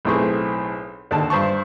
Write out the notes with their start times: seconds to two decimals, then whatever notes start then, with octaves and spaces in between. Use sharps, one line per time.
0.05 B1 A2 A3 C4 G#4 C#6
1.11 D#2 D3 A5
1.30 G2 C5 A5 C#6